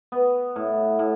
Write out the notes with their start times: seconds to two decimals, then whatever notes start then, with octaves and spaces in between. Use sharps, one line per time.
0.12 B3
0.56 A2
0.99 A2